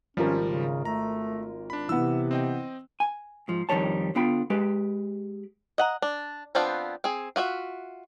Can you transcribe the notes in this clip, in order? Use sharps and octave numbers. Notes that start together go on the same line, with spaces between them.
G#1 F3 G3 C#4 F4 A#4
C#3
A3 A#5
D4 B5
C3 E3 B3 E6
C4 D#5 G5
G#5
G#2 F3
F2 D#3 G3 C#5 A5
D3 B3 F4 G5 B5
G#3 G4 B4
D#5 F#5 A#5
D4
F3 B3 C4 D4 F4
C4 G#4
F4 F#4 G#4 E5